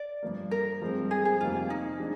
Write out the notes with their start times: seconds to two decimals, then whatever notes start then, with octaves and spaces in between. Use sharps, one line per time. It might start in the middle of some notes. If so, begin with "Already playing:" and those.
Already playing: D5
0.23 G2 F3 A#3
0.51 A#4
0.82 G2 F3 G#3 C4
1.11 G#4
1.25 G#4
1.41 F2 C3 D#3 G3 A#3 F4
1.70 D#4
1.99 F3 G#3 D4